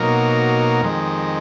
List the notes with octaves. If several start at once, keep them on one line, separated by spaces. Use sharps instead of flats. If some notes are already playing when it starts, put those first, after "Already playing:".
Already playing: B2 F#3 A#3 D#4 A#4
F2 D#3 G#3